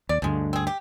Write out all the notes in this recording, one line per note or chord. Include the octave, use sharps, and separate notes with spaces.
D#2 D5
D2 G2 D3 F3 G#3
C4 G#4
G4